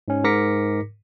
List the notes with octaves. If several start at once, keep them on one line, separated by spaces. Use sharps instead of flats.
G#2 C#4
G#2 A#4 D6 A#6 B6 C#7